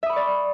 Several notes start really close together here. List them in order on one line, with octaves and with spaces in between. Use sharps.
E5 D#6 B5 C#6 D5